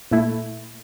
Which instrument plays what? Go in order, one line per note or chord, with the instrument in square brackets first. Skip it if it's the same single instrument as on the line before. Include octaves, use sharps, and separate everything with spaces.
[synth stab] A#2 A3 E4